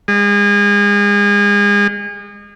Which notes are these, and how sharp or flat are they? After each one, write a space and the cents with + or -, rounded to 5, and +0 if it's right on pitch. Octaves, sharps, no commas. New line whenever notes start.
G#3 -35